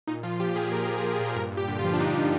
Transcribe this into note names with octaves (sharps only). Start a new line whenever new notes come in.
A#2 D#4
F3 F4
F3 G4
A#2 G#4
A#2 A#4
F3 G#4
F3
G#4
A#2
G2 A#4
G2
G4
D3
F4
F3
D4
G2 D#4